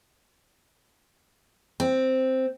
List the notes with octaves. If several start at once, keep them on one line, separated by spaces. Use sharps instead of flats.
C4